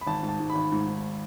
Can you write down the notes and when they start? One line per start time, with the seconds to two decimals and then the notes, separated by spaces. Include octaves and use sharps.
0.01 B5
0.07 G#1 A5
0.23 G#2
0.28 A5
0.40 G#2
0.50 B5
0.55 G#1
0.72 G#2
0.87 G#2